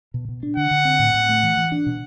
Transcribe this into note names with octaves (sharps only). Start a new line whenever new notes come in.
B2
B2
D4
D3 F#5
D3
C4
A2
A2
A3
E3
E3
D4
B2